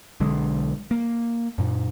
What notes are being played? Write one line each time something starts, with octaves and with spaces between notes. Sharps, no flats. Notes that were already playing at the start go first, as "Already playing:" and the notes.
B1 D3 G#3
A#3
F#2 A#2